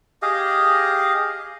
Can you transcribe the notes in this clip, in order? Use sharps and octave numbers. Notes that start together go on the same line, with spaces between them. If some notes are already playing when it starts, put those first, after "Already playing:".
G4 G#4 D#5 F5